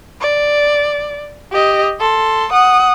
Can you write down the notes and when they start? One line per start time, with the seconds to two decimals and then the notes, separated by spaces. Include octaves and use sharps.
0.21 D5
1.52 G4 D#5
2.00 A4 C6
2.53 F#5 D#6